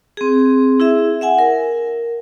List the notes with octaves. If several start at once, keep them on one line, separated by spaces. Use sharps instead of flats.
C4 G#4
E4 G#4 E5
E5 F#5 G#5
A#4